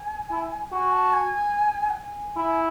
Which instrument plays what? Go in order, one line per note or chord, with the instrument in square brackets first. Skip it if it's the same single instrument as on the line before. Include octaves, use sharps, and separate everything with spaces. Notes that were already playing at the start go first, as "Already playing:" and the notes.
Already playing: [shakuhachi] G#5
[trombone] E4
[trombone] F#4 [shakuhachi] G#5
[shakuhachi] A5
G#5
F#5
G#5
[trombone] E4